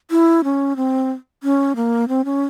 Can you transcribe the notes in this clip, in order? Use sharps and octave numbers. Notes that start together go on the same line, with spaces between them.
E4
C#4
C4
C#4
A#3
C4
C#4